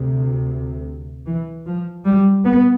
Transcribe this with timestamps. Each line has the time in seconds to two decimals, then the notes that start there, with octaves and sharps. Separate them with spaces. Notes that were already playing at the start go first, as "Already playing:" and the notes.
Already playing: D2 C3
1.25 E3
1.65 F3
2.05 G3
2.45 B3